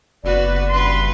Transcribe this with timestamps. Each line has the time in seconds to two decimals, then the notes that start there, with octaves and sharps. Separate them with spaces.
0.24 F#1 B3 F#4 B4 D5
0.69 G2 C#4 B4 C6